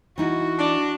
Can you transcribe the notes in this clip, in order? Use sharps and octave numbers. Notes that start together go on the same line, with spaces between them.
E3 D#4 E4 F#4
D4